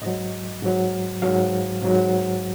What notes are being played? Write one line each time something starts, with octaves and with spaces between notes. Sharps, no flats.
G#2 F#3 D#5
G#2 F#3
G#2 F#3 F5
G#2 F#3